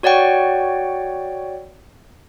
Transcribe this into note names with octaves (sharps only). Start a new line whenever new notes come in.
F#4 C#5 D5 F#5 G5